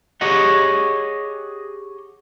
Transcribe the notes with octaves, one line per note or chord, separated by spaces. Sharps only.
G4 G#4 C#5 D#5 F#5